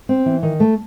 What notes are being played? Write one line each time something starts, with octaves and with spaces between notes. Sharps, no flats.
C4
E3
D#3
A3